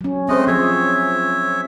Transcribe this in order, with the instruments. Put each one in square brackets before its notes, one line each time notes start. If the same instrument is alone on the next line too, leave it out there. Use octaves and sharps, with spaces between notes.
[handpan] F#3 C#4
[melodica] G#3 A3 D#5 [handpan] C4 C5
[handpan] F3 G#4 [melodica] C#5 E5